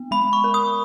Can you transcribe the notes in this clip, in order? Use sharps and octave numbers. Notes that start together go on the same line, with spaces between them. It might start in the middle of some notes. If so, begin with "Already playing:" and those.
Already playing: B3
G#3 B5
C#6
A#4
D#6